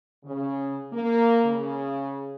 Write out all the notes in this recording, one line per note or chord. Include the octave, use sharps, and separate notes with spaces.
C#3
A#3
C#3